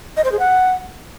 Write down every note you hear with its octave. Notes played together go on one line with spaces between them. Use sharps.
D#5
C5
G#4
F#5